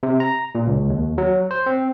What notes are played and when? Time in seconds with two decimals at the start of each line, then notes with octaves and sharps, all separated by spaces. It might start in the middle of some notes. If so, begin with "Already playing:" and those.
0.03 C3
0.20 A#5
0.55 A#2
0.67 C#2
0.90 D#2
1.18 F#3
1.51 C5
1.66 C4